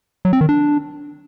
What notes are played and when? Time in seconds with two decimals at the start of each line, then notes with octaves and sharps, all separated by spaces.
0.25 F#3
0.33 C4
0.41 D#3
0.49 D4